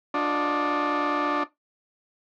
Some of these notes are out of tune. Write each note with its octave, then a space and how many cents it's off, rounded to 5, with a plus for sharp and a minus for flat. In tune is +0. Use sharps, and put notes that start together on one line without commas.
D4 +0 F4 +40 D#5 +0